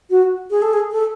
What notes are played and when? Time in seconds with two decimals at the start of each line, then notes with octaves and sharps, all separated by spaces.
0.10 F#4
0.51 G#4
0.62 A4
0.73 G#4
0.92 A4